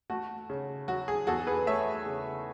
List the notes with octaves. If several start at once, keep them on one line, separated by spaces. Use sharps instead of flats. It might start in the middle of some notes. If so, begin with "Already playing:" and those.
A3 F#4
C#3
F#3 F#4
G#4
E2 F#4 A4
G#4 B4
A3 C#5 E5
C#3